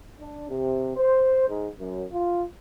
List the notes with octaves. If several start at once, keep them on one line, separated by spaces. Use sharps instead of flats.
D4
C3
C5
G#2
F#2
F4